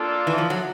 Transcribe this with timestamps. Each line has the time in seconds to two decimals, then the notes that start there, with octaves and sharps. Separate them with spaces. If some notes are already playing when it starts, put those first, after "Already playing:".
Already playing: A#3 D4 F4 A4
0.27 E3
0.38 F3
0.50 F#3